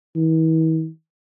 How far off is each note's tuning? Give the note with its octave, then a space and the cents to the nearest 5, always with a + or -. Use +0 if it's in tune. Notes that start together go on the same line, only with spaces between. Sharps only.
E3 -45